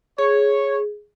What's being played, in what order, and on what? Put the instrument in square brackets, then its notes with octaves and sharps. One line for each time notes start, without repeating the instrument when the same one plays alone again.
[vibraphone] G#4 [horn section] C#5